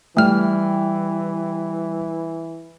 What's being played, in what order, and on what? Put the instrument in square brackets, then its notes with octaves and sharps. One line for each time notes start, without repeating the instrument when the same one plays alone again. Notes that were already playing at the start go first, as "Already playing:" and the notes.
[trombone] E3 [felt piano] G3 G5 [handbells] A3 F6